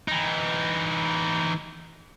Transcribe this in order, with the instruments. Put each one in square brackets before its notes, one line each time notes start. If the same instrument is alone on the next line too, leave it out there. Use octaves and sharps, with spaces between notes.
[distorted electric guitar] E3 D#4